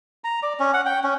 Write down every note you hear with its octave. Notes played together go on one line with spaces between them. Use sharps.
A#5
D5
C#4
F#5
G5
C#4